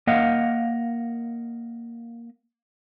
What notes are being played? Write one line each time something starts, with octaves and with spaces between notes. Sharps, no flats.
A#3 D#5 F5 F#5